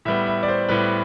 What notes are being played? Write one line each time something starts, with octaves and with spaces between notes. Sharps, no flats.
A2 G3 B3 E5
E5
D5
C5
A2 G3 B3 B4